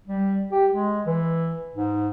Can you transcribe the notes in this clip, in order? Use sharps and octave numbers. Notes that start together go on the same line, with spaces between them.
G3
G4
G#3
E3
G#2